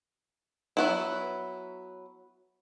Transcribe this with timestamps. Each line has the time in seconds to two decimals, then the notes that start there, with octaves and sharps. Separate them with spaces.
0.77 F#3 B3 E4